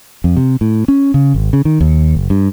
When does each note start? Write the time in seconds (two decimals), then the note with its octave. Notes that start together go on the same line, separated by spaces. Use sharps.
0.24 F2
0.36 C3
0.61 A2
0.88 C#4
1.14 C#3
1.34 G#1
1.53 C#3
1.65 D#3
1.81 D#2
2.15 F#1
2.30 G2